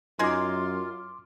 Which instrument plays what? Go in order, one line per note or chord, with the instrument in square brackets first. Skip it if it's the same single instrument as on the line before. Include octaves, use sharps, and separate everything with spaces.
[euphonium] F#2 [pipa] D#4 G#4 A#4 [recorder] F4 [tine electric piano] C6 D6